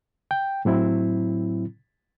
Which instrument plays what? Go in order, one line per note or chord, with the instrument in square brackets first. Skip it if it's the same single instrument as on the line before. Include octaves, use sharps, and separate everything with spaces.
[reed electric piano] G5
A2 F#3 C4 E4